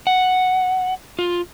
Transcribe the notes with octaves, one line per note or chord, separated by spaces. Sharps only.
F#5
F4